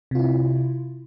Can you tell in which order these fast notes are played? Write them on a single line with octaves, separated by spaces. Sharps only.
C3 F4 E4